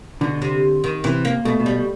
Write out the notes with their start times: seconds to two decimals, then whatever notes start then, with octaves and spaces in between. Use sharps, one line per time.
0.21 B2 D3
0.42 C3
0.84 D#3
1.04 C3 E3
1.25 A#3
1.45 B2 A3
1.60 B2
1.66 G3